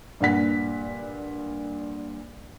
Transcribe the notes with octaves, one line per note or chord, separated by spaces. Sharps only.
G2 A#2 F#5 B6